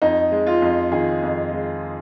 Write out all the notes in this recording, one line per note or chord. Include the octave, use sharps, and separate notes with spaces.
F2 D#4
G#3
F4
F2
D#3 G#4
F2
G#3